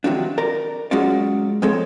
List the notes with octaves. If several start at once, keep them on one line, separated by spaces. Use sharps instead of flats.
C3 D#3 F3 F#3 D4
A#4 D5 A#5
F#3 G#3 C#4 F4 F#4 D5
F2 F3 G#3 C4 A4 C#5